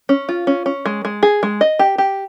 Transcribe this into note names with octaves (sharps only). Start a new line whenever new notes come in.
C#4
F4
C#4
C#4
G#3
G#3
G#4
G#3
D#5
G4
G4